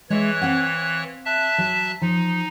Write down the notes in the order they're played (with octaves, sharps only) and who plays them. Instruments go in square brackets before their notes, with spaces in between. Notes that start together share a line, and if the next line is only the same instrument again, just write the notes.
[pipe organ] E3 C#5 F#6 [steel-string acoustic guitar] G#3 E5
[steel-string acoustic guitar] C4 F5 F#5
[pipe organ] E5 A5 F#6
[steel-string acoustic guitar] F#3
[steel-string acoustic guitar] F3 [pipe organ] D#4